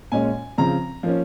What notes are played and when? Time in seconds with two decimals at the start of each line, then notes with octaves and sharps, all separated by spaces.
0.12 A#2 G#3 C#4 G#5
0.58 C#3 F3 C4 A#5
1.03 F3 A#3 C#4